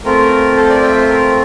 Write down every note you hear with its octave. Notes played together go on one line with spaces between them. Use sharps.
A3 C4 F4 A#4
A4 C5
A#4 D5
E5 G5
C5 E5
A#4